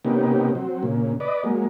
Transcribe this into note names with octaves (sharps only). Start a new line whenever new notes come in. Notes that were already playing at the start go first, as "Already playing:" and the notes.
C3 A#3 B3 C#4 D#4 G4
F#3 C4
A#2 C#3
B4 D5 D#5
F#3 G#3 A#3